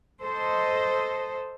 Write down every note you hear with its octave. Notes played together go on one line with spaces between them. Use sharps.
A4 C5 D#5